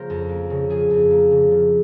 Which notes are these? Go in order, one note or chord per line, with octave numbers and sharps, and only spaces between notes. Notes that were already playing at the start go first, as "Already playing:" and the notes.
Already playing: C#3 F3 A#3 A#4 C5
F2
A#3
C#3
F3 G#4
F2
A#3
C#3
F3